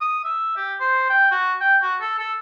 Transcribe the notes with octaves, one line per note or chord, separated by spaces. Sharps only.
D#6
E5
G4
C5
G5
F#4
G5
F#4
A4
A4